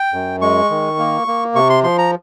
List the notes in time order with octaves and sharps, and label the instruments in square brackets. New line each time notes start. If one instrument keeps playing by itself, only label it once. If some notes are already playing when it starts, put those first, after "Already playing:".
Already playing: [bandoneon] G5
F#2
G#3 C#6
D#3
A#3
A#3
C3 C#6
C6
F3 C6
A#5